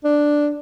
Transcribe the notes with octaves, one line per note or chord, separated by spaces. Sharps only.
D4